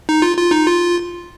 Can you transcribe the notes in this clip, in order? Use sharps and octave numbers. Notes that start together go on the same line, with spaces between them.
D#4
F4
F4
D#4
F4